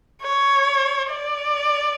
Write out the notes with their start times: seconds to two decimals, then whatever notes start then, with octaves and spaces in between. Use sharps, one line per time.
0.22 C#5
1.11 D5